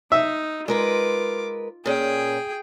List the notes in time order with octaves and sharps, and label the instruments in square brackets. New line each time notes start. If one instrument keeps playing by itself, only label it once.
[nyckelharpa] D#4 [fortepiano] E5
[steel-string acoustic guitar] G#3 A#4 B4 [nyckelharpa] F4 D6
[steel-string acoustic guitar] A#2 C#4 [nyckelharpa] G#4 G5